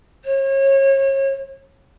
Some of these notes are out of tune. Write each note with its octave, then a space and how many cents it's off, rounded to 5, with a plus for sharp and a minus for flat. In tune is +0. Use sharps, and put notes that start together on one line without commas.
C#5 -35